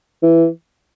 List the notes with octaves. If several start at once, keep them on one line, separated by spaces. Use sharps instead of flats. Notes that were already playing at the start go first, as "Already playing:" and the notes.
E3